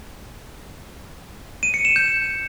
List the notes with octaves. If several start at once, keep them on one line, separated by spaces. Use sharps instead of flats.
D#7
C#7
E7
G6